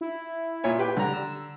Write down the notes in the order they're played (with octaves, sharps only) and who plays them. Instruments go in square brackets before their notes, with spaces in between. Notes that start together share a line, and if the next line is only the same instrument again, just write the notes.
[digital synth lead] E4
[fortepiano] A#2 C#5 G#5
G4 B4 G5
[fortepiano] D3 A#5 [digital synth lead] G3
[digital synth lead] E6